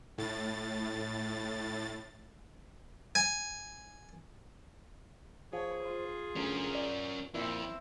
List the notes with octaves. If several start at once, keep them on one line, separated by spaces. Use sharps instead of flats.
A2 A6
G#5
F3 G#4 C#5
F4
D2 C#4 A#4
D5
F2 A#2 C4 E4 E5